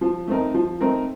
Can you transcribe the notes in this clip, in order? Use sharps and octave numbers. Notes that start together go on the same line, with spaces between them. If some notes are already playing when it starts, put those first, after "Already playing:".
F3
A3 C4 D#4 A#4
F3
A3 C4 D#4 A#4